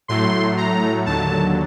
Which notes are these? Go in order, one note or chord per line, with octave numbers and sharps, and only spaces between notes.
A2 F#3 A3 C6
A#5
D#2 D3 F#3 A5